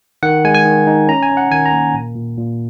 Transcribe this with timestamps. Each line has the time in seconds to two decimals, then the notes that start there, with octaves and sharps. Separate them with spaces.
0.23 D#3 F#5
0.45 G#3 G#5
0.55 G#5
0.65 D#3
0.87 D#4
1.08 C#4 A#5
1.23 G#5
1.29 C#4
1.37 F#5
1.51 D#3 G#5
1.66 A#5
1.73 A#3
1.94 A#2
2.15 A#2
2.38 A#2